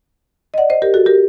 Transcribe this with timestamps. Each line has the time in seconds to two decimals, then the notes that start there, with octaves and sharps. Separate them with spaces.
0.54 D#5
0.58 D5 F#5
0.70 C5 D#5
0.82 G4 A#4
0.94 F#4 A4
1.06 G4 A#4